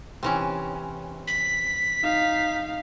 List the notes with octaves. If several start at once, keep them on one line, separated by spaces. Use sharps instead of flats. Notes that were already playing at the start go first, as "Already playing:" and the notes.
C3 E3 C#4
B6
D#4 F5